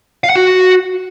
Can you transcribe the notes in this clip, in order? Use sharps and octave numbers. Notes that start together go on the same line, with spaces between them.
F5
F#5
F#4